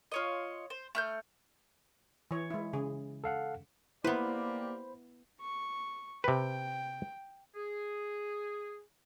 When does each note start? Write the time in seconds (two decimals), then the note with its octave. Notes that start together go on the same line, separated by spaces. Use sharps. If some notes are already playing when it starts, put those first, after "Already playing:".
0.12 F4 C#5 D#5
0.70 C5
0.95 A3 F6 G6
2.31 E3 C#5
2.50 G#3 E4
2.73 C#3 G#4
3.24 A4 F5 F#5
4.04 A#3 B3 E4 G4 B4 C5 D5 B5
5.40 C#6
6.24 C3 B4 G5
7.56 G#4